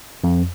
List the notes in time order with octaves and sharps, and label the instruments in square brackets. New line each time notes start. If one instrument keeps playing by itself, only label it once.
[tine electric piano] F2